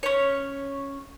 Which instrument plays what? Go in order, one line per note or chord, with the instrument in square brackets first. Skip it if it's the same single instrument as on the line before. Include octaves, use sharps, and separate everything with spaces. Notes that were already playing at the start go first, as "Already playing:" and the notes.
[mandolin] C#4 C#5